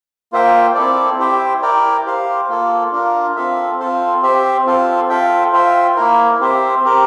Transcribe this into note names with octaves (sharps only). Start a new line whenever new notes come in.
A#3 F4 C5 E5 G5
C4 E4 A4 D5
E4 G4 C5 E5 G5
E4 A#4 D5 G5
G4 C5 F5
A#3 F4 A4
D4 F4 A#4
C4 F4 A4 E5
C4 F4 A4 C5
C4 G4 C5 E5
C4 F4 A4 C5
F4 A4 E5 G5
F4 C5 E5 G5
A#3 E4 A#4
C4 G4 C5 E5
C4 G4 A#4